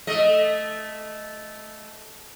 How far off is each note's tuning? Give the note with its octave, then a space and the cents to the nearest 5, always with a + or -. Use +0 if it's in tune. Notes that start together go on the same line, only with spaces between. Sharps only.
A3 -10 D#5 +0